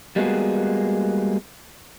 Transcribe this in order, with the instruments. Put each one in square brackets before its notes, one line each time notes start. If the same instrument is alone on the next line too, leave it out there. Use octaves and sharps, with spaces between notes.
[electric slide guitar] G3 G#3 A#3 B3 F#4 G#4